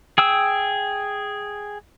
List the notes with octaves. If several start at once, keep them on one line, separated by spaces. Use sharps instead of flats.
G#4 G5 E6